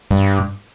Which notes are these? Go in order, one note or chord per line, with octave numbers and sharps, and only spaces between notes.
G2